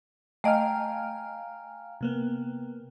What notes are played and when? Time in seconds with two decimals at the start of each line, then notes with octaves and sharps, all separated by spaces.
0.44 A3 D#5 F5 G5 G#5 A#5 F6 D7
2.01 C3 A#3 B3